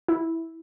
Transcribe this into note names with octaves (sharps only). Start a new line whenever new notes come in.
E4